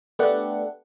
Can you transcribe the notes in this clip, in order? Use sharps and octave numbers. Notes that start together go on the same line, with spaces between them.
A3 B3 D4 G4 A4 F#5